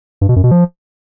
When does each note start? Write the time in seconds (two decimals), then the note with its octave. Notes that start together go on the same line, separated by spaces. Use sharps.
0.21 G2
0.29 B2
0.36 F#2
0.44 B2
0.51 F3